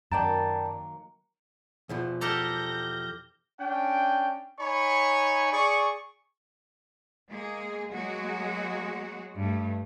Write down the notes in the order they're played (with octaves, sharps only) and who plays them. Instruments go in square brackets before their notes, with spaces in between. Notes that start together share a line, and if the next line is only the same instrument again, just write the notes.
[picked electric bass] F#2 [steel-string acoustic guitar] D#3 F#3 A#3 [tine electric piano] D5 G5 A5 [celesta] A#5
[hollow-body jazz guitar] E2 B2 F3
[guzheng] G4 A4 A#5 [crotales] D6 F6 G7 [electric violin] G6 A#6
[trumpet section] C#4 D4 G5
D#4 C#5 G#5 B5 C#6
G#4 D5 C#6
[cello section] G#3 A#3 G#4
F#3 G#3 A#3 F#4
G2 A3